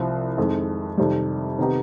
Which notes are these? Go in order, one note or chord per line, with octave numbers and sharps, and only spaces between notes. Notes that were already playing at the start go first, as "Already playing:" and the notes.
Already playing: C2 C3 F3
F2 D#3 G#3
F2 C3 D#3 G3
C3 D#3 B3 D#4 G4